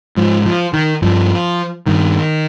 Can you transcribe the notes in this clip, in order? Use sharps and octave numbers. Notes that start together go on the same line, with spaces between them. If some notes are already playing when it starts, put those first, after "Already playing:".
G#2 F3
F3
D#3
G2 F3
G2 D#3